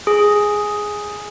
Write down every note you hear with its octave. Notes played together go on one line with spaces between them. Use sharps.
G#4